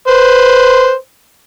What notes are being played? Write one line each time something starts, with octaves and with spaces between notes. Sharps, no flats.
B4 C5